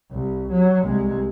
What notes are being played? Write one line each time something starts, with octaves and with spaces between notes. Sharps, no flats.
C2
F#3
C2 G#3